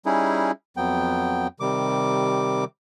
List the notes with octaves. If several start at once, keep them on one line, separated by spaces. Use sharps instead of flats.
G3 C#4 D#4 E4 G#4
F2 F#3 B3 G5
C3 D#3 G3 D6